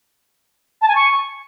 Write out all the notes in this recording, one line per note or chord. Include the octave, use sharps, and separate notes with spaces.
A5
G#5
C#6